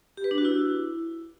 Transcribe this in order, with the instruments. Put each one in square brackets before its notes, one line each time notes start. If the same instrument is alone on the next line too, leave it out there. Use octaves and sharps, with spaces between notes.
[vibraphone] G4
B4
D4
F#4
E4